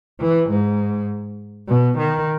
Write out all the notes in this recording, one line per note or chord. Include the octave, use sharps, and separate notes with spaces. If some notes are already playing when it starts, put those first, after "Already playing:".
E3
G#2
B2
D#3